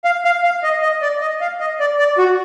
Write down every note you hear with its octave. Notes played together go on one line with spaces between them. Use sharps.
F5
F5
F5
D#5
D#5
D5
D#5
F5
D#5
D5
D5
F#4